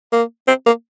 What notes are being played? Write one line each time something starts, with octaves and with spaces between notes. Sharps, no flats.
A#3
C4
A#3